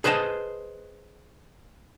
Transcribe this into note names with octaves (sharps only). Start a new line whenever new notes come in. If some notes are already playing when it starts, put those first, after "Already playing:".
G#4 B4 C5 D#5 F#5 A5